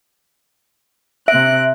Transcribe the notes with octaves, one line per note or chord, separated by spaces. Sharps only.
C3 E5 F#6 A#6 D7